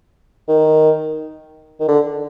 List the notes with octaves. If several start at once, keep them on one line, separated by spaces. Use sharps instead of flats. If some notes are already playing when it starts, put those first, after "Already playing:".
D#3
D#3
D3